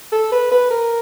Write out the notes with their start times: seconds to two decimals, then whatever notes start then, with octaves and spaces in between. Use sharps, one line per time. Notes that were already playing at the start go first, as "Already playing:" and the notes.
0.12 A4
0.32 B4
0.51 B4
0.71 A#4